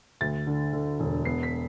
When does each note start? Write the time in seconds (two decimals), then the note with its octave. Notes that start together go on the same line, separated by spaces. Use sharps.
0.21 D2 A6
0.47 D3
0.73 D3
1.00 E1
1.25 B3 C7
1.43 B6